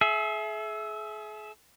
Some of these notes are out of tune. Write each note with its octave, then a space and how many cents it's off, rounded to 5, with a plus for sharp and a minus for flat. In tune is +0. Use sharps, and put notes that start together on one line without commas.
G#4 +40 E5 +0